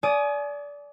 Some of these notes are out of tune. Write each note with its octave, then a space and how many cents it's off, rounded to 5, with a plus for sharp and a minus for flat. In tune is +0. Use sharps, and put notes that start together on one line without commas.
D5 -20 G#5 +35 D#6 +0